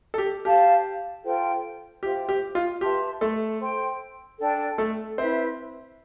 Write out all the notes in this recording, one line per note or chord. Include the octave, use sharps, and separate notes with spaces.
A4
G4
G4 C5 F5 A5
F4 A4 C5 G5
F4 G4 C5 E5 G5
G4
F4
G4 B4 E5 A5 C6
A3 A4
C5 G5 C6
D4 A4 D5 G5
A3 A4
C4 E4 B4 C5 E5